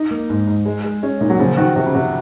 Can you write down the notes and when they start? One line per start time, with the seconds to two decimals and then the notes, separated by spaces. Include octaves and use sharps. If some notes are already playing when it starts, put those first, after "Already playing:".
Already playing: D#4
0.11 A#3
0.29 G#2
0.47 G#2
0.66 G#3
0.84 G#3
1.03 G#3 C#4
1.21 A#2 D#4
1.30 F#3
1.40 C#3 F3
1.57 D#3 F#4
1.76 C3 F#4
1.86 C#3
1.95 C3 F#4